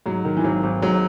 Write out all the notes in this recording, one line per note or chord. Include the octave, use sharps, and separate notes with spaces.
G#2 F#3
D#3
E3
G#1 F#3
G#1
G#2 F#3